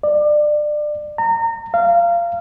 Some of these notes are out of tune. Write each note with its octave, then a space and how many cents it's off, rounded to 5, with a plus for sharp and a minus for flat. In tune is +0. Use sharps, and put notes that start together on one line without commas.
D5 +25
A#5 -30
F5 -20